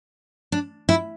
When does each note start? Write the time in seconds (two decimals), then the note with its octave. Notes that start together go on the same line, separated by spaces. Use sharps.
0.52 D4
0.89 E4